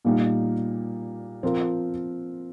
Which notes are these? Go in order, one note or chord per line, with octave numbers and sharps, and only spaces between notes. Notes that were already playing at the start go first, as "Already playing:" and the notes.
A#2 G3 A#3 D#4
F3 C4 F4 A#4